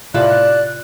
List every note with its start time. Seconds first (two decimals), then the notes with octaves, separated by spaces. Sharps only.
0.14 A2 C3 F4 D5 A5 B5 F#6